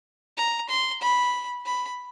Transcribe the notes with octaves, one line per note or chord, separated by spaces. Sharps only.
A#5
C6
B5
B5